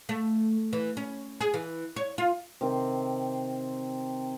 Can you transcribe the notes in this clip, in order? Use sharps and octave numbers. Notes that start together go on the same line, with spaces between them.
A3
E3
C#4
G#4
E3
C#5
F4
C3 D#3 C4